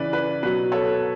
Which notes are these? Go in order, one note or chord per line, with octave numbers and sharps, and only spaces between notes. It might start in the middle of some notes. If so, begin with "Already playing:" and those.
Already playing: C#3 E3 B4 D5
B4
B2 F#3 B4
A4 C#5